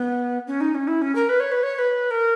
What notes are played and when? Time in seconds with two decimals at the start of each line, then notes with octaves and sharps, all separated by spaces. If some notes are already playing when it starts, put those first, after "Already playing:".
Already playing: B3
0.47 C#4
0.61 D#4
0.75 C#4
0.88 E4
1.02 C#4
1.15 A#4
1.29 B4
1.40 C#5
1.52 B4
1.63 C#5
1.75 C#5
1.78 B4
2.11 A#4